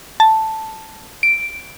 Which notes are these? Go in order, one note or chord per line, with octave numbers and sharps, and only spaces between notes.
A5
D7